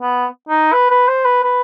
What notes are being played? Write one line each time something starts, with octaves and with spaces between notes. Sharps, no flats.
B3
D#4
B4
B4
C5
B4
B4